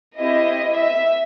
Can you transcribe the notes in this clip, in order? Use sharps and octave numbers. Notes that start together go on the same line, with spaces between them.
C4 E4 G4 D#5
E5